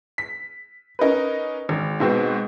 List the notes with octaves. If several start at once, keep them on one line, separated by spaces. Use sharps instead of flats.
B6
C#4 D#4 A#4 B4
G#1
G#2 B2 C4